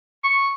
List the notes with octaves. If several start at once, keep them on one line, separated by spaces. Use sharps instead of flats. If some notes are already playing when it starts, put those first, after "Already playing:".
C#6